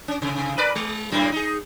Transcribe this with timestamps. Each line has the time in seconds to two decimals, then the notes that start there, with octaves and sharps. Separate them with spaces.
0.08 C#4
0.22 C3
0.58 A#4 B4 D5
0.75 G#3
1.12 F#2 A2 A#3
1.32 D#4 G#4